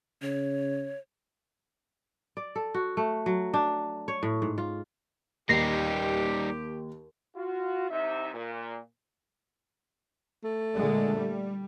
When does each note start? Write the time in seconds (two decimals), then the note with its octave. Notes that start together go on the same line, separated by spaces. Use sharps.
0.22 C#3 C#5
2.37 D5
2.56 A4
2.74 F#4
2.97 A3
3.26 F#3
3.54 D4
4.08 C#5
4.23 A2
4.42 G#2
4.58 F4
5.49 D#2 G3 D#4 G4 A#6 C7
7.36 F4 F#4
7.90 C2 C3 D#4 E5
8.34 A#2
10.44 A3
10.75 A#2 D3 G#3
11.15 G3